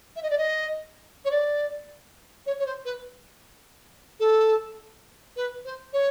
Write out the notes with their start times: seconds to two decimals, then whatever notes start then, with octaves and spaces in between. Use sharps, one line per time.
0.16 E5
0.23 D#5
0.30 D5
0.38 D#5
1.25 C#5
1.31 D5
2.46 C#5
2.59 C#5
2.66 C5
2.85 B4
4.20 A4
5.36 B4
5.65 C5
5.93 C#5